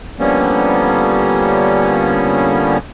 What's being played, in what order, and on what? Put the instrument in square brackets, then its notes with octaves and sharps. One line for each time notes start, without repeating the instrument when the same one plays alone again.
[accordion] D3 F3 G3 A#3 B3 C#4